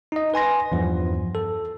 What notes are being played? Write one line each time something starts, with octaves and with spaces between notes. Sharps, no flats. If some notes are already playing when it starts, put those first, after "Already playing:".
D#4 D#5
B4 G#5 C6 A#6
E2 G2 F3
A4